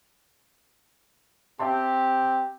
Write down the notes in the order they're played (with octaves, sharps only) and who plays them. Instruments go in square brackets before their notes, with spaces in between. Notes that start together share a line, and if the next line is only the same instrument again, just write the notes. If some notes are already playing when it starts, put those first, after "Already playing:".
[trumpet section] C4 G4 [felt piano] E5 A5 C6